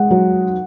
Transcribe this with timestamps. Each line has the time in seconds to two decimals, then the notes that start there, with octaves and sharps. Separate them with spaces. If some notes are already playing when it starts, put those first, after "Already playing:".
Already playing: G#3 F#5
0.10 F#3